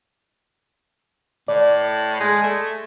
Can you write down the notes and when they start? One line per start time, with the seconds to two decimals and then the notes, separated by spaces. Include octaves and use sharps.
1.48 A2 D5
2.20 G#3
2.43 A3